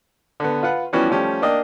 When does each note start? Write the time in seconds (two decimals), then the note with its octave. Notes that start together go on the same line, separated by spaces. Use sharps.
0.40 D3 B3
0.63 F4 B4 F#5
0.93 E3 F3 G3 B3 C#4 F#4
1.09 F3 G3 A3 C#4 G4
1.42 A#3 D4 D#5 G5